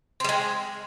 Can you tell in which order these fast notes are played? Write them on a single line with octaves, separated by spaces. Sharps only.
C4 G3 G#3